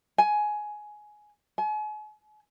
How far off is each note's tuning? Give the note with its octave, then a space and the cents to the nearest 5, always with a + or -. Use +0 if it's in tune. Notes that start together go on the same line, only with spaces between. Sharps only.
G#5 +15
G#5 +40